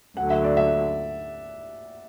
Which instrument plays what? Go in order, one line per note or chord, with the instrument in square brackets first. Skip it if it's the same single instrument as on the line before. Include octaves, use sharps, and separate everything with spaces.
[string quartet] D2 D3 F#3 [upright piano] F#5
[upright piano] E5
D5
E5